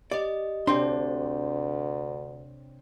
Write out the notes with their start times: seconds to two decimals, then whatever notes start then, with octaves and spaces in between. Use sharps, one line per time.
0.11 G4 D5 D#5
0.67 D2 C3 C4 D4 C#5 C6